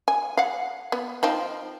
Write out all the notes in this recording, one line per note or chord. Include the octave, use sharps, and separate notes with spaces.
G#5
F5 F#5
B3
F3 C4 D#4